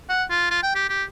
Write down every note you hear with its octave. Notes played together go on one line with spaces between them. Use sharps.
F#5
F4
F4
G5
G4
G4